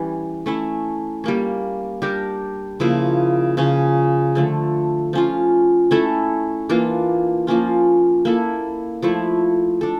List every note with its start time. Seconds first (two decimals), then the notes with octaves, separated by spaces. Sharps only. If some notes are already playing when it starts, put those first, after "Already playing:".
Already playing: E3 G3 C#4
0.46 A3 C#4 E4
1.24 G3 A#3 C#4
2.02 G3 D4 G4 A#4
2.80 C#3 F3 A#3 E4
3.57 C#3 F3 C#4
4.35 D3 F3 A3
5.13 F3 C#4 F4
5.91 A3 C#4 E4 A4
6.69 E3 A#3 D4 F4
7.47 F3 A#3 C#4 F4
8.25 A#3 E4 A4
9.02 F3 A3 E4
9.81 D4 A4